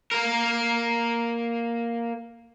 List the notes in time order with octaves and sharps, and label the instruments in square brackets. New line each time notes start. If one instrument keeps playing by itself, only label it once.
[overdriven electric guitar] A#3 A#4